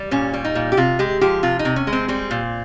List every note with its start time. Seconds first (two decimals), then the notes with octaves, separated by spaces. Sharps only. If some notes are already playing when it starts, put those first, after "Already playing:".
Already playing: G3
0.11 A#2 C#4
0.33 G3
0.45 D#4
0.55 A#2
0.72 G4
0.77 C3 F4
0.99 G#3 G4
1.21 F3 G4
1.43 C3 F4
1.59 D#4
1.65 C3
1.76 C#4
1.87 G#3
1.93 C4
2.08 G3 C4
2.31 A#2